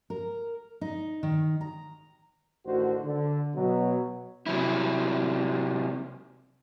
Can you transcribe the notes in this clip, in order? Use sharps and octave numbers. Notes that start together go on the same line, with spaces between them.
A#4
D#4
D#3
A#5
A1 D2 D3 D#3 F#4 C5
D3
B2 F#3
C3 F#3 E4